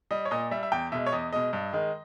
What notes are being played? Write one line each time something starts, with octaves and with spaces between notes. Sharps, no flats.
G3 D#5
C#5
A#2 D#5
G3 E5
E5
E2 G5
B2 G#3 E5
C#5
E2 D#5
B2 G#3 D#5
G2
D#3 G#3